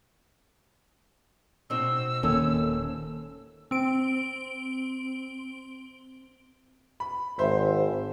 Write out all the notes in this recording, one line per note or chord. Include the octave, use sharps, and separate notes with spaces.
B2 C4 D#4 E6
D#1 D#3 A#3 C4 C#4 A4
C4 D7
B5
G#1 C5 E5